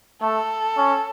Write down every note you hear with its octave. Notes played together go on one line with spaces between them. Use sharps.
A3 A4
C#4